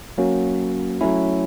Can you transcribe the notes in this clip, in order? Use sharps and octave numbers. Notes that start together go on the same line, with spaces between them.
F#3 A#3 C#4 F#4
F#3 A3 C#4 E4